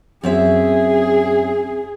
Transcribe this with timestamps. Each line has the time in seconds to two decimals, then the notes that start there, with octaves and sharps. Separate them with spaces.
0.23 F#2 C4 G#4 E5